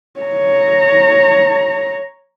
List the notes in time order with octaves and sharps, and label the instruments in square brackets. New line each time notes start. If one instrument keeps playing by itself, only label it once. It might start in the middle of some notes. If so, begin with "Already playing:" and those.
[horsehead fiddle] C#5 A#5